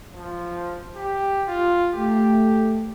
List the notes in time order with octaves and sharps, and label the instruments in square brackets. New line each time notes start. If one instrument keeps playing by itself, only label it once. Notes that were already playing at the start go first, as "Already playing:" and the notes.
[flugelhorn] F3
G4
F4
[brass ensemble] A3 [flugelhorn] G4